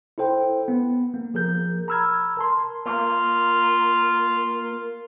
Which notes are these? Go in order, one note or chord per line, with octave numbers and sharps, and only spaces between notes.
E4 A4 C5 G5
B3
A#3
F3 G#4 A#4 G6
A#5 B5 E6 F6 G#6
A#4 A5 C6
A#3 F4